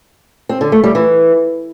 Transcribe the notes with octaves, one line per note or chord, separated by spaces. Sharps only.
C4
D3
A3
G3
E3